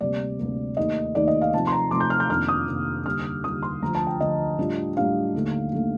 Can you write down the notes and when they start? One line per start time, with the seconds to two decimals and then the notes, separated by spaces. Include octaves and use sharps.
0.01 D2 C3 G3 A#3 D5
0.39 D2 C3 G3 A#3
0.77 D#2 D#3 A3 D#4 D#5
1.15 D#2 D#3 A3 D#4 D5
1.27 D#5
1.41 F5
1.54 C3 F3 A3 D#4 A5
1.67 C6
1.72 A#5
1.91 C3 F3 A3 D#4 D6
2.00 G6
2.10 F6
2.20 G6
2.29 F2 C3 D#3 A#3 D4 F6
2.48 D#6
2.67 F2 C3 D#3 A#3 D4
3.06 D#2 D3 G3 F6
3.43 D#2 D3 G3 D#6
3.63 C6
3.82 D2 D3 F3 A#5
3.95 A5
4.07 G5
4.20 D2 D3 F3 D#5
4.58 A2 G3 D4 F4
4.96 A2 G3 D4 F4 F5
5.34 D#2 D3 A3
5.72 D#2 D3 A3